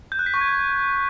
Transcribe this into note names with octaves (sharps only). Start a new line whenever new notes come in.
G6
F#6
B6
C#6
G#6